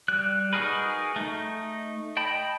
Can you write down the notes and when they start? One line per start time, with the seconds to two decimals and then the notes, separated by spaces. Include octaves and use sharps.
0.08 G3 F#6
0.53 D#4 F#4 G#4 A#4 B4
1.16 A3 D#4
2.17 D#5 G5 A5 B5